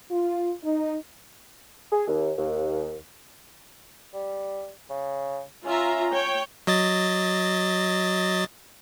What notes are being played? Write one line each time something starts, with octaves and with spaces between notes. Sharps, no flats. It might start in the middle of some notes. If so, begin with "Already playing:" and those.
F4
D#4
G#4
D#2
D#2
G3
C#3
C#4 F4 E5 A#5
C#5 G5
F#3 D#5 A6